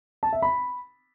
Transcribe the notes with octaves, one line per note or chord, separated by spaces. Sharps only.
A5
E5
B5